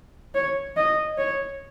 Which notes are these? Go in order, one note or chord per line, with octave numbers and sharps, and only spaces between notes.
C#5
D#5
C#5